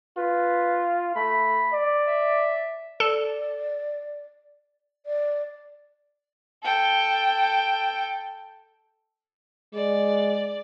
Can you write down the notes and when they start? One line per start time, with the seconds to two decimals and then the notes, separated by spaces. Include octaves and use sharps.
0.17 F4 B4
1.16 A3 B5
1.73 D5
2.07 E5
3.00 A4 D5
5.06 D5
6.63 A4 G5
9.74 G#3 D5